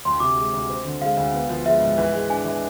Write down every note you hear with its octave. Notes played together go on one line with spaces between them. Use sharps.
D2 C6
C3 D6
G#3
D2
C4
D3
G#3 F5
D2
B3
F3
G#3 E5
G#2
E3
G#3
D4 G#5
E3